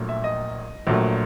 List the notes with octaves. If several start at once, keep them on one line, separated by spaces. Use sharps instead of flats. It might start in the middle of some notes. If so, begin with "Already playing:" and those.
Already playing: A#1 A#2 F#3 A3
E5
D#5
A#1 A#2 F#3 A3